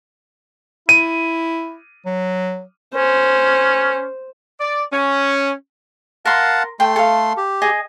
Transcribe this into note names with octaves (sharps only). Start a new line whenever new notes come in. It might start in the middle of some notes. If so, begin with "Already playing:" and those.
E4 D#7
F#3
C#4 C5
D5
C#4
A#4 F5 F#5 A5 C6
A3 G5 C6
A4 F5
G4
G#4 D#5 D#6